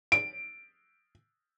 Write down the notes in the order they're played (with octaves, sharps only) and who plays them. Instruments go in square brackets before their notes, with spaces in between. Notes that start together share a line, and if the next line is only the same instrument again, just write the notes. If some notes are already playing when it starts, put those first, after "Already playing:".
[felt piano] D7